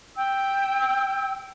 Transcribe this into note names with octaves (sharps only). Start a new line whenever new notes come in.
G5 E6